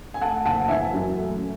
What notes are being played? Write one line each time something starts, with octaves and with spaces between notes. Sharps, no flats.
G#5
A3 F#5 A5
F#1 F#5 A5
E3 E5 G#5
F#2
A3